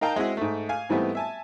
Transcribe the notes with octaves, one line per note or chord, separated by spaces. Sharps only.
D#4 A#4 F5 G5 A5 A#5
G#3 C4 E4 F#4 G#4
G#2 A3
F5 G#5
G#2 E3 G3 A3 B3 C4
E5 G#5 A5